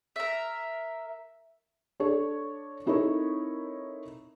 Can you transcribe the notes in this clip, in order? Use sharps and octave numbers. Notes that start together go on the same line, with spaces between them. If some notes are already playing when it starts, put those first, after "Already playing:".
A#4 E5
D4 A4 C#5 D5
C4 D#4 E4 A4 A#4 C#5